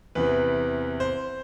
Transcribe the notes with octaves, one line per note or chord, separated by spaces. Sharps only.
E2 C3 E3 B4
C5